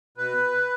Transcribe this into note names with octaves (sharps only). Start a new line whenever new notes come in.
B2 B4